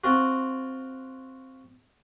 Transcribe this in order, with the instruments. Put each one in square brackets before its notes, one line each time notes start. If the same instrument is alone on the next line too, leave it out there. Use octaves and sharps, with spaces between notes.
[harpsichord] C4 F4 F#4